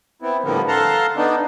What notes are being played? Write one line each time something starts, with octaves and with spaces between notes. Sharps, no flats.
B3 C4 E4
A2 D3 F3 G3 A#3 B3
A4 F5 F#5 A5 A#5 C6
B3 D4 D#4